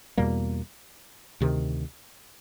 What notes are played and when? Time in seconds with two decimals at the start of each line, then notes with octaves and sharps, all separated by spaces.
0.17 E2 B2 G3 A#3
1.40 D2 C3 D#3